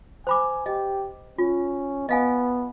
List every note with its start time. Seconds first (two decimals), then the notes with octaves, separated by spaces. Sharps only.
0.27 C5 G#5 B5 D6
0.66 G4 D#5
1.38 C#4 F4
2.09 B3 D#5 F5 G#5